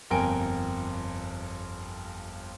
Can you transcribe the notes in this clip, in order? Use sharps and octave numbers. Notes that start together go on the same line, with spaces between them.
G1 F2 A#4 G5 G#5 D7